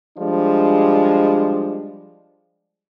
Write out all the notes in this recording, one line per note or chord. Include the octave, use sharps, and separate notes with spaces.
F3 G3 G#3 D4